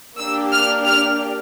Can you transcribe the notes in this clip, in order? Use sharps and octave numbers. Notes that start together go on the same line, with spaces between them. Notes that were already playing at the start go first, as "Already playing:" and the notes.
A#3 D4 G4 E6
F6
F6